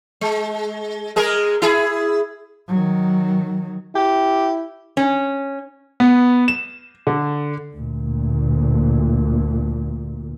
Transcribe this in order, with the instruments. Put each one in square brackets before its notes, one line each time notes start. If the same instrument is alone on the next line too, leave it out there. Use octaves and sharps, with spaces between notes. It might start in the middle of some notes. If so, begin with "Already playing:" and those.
[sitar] G#3
G#3 G#4 A#4
E4 G#4
[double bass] D#3 F#3
[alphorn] E4 [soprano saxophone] G4
[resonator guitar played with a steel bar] C#4
[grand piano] B3
E7
D3
[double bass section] D2 A#2